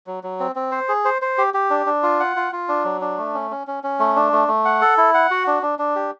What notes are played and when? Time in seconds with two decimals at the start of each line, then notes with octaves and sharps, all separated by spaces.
0.07 F#3
0.23 F#3
0.40 C4
0.56 C4
0.72 C5
0.89 G#4
1.05 C5
1.22 C5
1.38 G4
1.54 G4
1.70 D4
1.86 D4
2.03 F4
2.20 F#5
2.36 F4
2.52 F4
2.69 D4
2.84 F#3
3.01 D4
3.17 A3
3.34 C#4
3.51 C#4
3.67 C#4
3.84 C#4
3.99 A3
4.16 D4
4.32 A3
4.48 A3
4.65 F#5
4.81 A4
4.97 E4
5.14 F#5
5.31 F#4
5.47 D4
5.62 D4
5.79 D4
5.96 G4